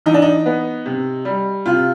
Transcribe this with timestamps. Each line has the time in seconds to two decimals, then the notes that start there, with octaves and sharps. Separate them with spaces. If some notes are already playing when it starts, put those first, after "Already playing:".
0.06 E3 D#4
0.14 D4
0.22 D#4
0.46 B3
0.86 C3
1.25 G3
1.66 C3 F4